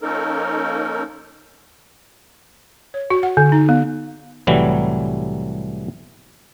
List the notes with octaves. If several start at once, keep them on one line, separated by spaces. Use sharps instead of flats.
F3 A#3 C#4 D#4 A4 A#4
C#5
F#4
F#5
D3
D#4
B3
C2 A2 E3 F#3 G3